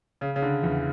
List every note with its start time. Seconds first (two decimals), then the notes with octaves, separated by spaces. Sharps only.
0.21 C#3
0.36 C#3
0.42 D3
0.63 E2 E3